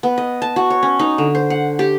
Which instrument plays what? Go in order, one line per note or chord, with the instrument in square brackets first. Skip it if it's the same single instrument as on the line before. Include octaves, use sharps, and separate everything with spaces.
[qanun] B3
D#5
A5
F#4
C#5
C#4
D#4
D3
C5
F#5
G4